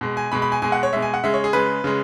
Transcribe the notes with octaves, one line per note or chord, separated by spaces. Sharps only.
B2 G#3
G#5
B2 G#3 B5
B5
G#5
B2 G#3 G#5
F#5
C#5
B2 G#3 E5
G#5
F#5
C#3 G#3 E5
C#5
G#4
C#3 G#3 B4
C#3 G#3